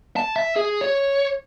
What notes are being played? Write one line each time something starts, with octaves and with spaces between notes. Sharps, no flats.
A5
E5
G#4
C#5